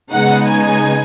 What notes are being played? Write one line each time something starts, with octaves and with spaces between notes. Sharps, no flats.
C#3 G#3 B3 D#4 F#5
G#5